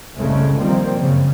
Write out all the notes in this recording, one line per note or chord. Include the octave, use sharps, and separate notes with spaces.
F#1 C2 G#2 C#3 G#3 A3
D#3 F3 G3 A#3 C4
F#2 C#3